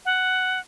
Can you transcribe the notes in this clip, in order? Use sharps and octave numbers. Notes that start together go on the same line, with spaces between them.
F#5